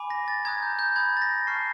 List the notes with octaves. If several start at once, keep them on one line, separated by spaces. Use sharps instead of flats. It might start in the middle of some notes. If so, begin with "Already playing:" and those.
Already playing: G#5 B5 D6
A#6
A6
A#5 D#6 F#6 G#6
G6
G6
B5 D#6 G6 G#6
A6
A#6
A5 C#6 F6 C7